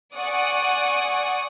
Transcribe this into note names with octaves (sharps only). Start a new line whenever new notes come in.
D5 F#5 G#5 C#6 D#6